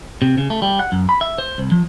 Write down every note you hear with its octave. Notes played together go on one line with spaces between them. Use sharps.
C3
C#3
A3
G3
F#5
F#2
B5
E5
C5
C2
F3